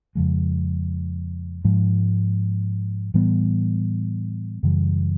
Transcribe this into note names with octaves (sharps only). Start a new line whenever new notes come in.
F2 C#3 F3 G#3
G#2 F3 G#3
A2 E3 G3 B3
F#2 C#3 E3 G3